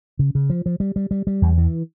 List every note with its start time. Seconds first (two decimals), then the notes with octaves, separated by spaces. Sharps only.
0.19 C#3
0.35 C#3
0.50 F3
0.66 F3
0.80 G3
0.96 G3
1.11 G3
1.27 G3
1.42 E2
1.58 E3